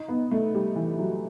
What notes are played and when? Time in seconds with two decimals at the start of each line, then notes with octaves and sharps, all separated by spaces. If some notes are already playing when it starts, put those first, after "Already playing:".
Already playing: D#4
0.08 B3
0.31 A3
0.54 G3
0.76 E3
0.99 F#3